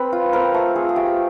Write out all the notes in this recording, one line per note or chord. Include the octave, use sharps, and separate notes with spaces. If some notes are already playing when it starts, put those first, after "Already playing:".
Already playing: C4 B4
F4
C4 A#4
A3 A4
F4 G#4
G#4
A3 G4